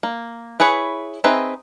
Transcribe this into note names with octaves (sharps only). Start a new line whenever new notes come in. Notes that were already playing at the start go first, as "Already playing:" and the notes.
A#3
E4 G#4 B4 C#5
C4 D#4 G#4 B4 E5